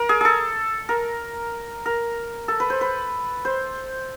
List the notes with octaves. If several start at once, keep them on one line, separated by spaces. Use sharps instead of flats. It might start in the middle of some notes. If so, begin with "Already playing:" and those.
Already playing: A#4
G#4
G#4 A4
A#4
A#4
A4
B4
C5
B4
C5